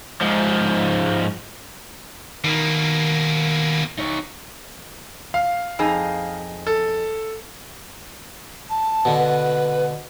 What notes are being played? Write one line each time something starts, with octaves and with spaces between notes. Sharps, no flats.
G#2 F3
B2 D#3 A#3
D#4 C#5
F5
F2 D#4 G#4
A4
A5
B2 D3
B4